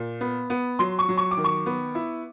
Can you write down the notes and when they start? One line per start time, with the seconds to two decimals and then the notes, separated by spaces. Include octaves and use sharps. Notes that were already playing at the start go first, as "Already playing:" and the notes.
Already playing: A#2
0.21 B3
0.50 B3
0.79 F#3 C6
0.99 C#6
1.09 F#3
1.18 C#6
1.31 D6
1.37 D#3
1.44 C#6
1.66 B3
1.95 E4